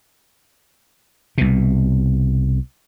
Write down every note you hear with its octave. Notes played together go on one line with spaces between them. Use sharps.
C2 B2